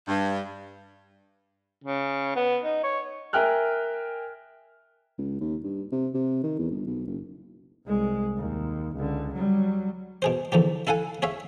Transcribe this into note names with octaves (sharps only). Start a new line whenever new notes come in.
G2
C#3
B3
D#4
C#5
A#4 E5 G5 G#5 F6 F#6
C#2
D#2
G2
C3
C3
D#3
E2
G1
B1
F#1
C2 G#3
D#2
C#2 D3
F#3 G3
B2 G#4 C5
E2 D3 F3 G4
E4 A4 F5 F#5 G#5
G#4 C#5 E5 F5